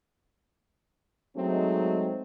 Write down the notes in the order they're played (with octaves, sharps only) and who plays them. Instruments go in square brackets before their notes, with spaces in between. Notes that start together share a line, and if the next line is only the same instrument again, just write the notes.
[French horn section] F#3 G#3 A3 C4 D#4